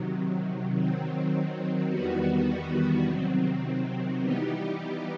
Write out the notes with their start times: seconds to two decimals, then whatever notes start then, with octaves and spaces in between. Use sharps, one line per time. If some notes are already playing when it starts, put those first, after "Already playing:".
Already playing: C3 D#3 F#3
0.73 D#3 F#3 C4
1.88 E2 D#3 G3 B3 F#4
3.05 C3 D#3 F#3 C4
4.20 E3 G3 B3 D#4 G4